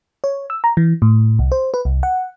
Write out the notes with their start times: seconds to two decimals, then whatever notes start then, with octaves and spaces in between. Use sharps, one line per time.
0.24 C#5
0.50 E6
0.64 A#5
0.77 E3
1.02 A2
1.39 C2
1.52 C5
1.74 B4
1.85 C2
2.03 F#5